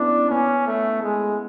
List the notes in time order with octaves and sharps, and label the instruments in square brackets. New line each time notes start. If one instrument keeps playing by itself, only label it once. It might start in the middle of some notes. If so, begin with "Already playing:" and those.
Already playing: [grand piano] B3 C#4 E4 [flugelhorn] D4
[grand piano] B3 [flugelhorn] C#4
[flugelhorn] A3
G#3